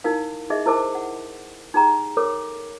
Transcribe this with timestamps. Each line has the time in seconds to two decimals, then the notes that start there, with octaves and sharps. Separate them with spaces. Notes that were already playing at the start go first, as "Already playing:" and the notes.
0.04 D#4 E4 A#4 F5
0.50 D#4 G#4 D#5 E5
0.66 E4 A#4 C5 A5 D6
0.95 F#5
1.74 D#4 G4 G#4 G5 A#5 C6
2.17 A4 A#4 C#5 D6